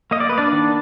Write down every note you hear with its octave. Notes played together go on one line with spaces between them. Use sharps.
A#3 D#5
D5
A#3 B4
D4 D5
D#3